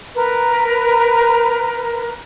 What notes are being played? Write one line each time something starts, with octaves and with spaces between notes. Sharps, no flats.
A#4 B4